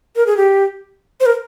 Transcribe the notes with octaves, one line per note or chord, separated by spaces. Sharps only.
A#4
G#4
G4
C5
A#4